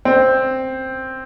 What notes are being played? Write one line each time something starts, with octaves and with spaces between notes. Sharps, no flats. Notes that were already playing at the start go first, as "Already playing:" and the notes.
C4